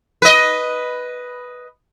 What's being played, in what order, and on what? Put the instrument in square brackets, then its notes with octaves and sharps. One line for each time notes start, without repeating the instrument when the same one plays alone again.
[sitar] B4 D#5